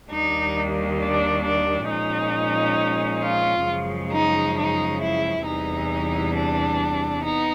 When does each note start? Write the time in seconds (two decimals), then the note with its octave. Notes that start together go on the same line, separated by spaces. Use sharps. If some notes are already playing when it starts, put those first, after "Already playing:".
0.10 D#2 D#3 G3 A#3 D4 D#4
0.99 D4
1.44 D4
1.88 A#2 F3 G#3 C#4 D#4
3.22 F4
3.67 F#2 C#3 F3 G#3
4.11 D#4
4.56 D#4
5.01 E4
5.45 E2 C3 E3 G3 D#4
6.34 D4
7.24 B3 D#4